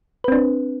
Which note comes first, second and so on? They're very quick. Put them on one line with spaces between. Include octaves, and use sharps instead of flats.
B4 C4 D4